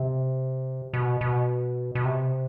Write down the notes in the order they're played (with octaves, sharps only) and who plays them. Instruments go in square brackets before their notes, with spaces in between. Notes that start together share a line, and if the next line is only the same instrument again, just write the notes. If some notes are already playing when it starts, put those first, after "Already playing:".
Already playing: [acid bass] C3
B2
B2
B2
C3